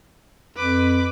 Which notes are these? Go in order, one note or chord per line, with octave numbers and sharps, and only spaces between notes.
F2 B4 D6